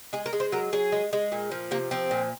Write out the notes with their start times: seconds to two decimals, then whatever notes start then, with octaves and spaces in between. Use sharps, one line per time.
0.13 G#3 G#4
0.26 A#4
0.33 G#3
0.40 C5
0.52 F#3 A#4
0.73 F#3 G#4
0.92 G#3
1.13 G#3
1.32 A#2
1.51 F3
1.71 C3 A#3
1.91 F3 C4
2.11 A#2